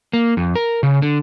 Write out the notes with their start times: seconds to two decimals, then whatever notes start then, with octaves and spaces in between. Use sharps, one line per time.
0.13 A#3
0.37 F2
0.55 A#4
0.83 C#3
1.02 D3